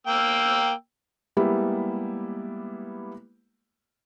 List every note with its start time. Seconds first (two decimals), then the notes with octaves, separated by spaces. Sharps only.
0.07 A#3 G5 E6
1.37 G3 G#3 A#3 B3 E4 G4